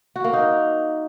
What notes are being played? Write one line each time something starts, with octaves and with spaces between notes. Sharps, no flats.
F#4
A#3
D#4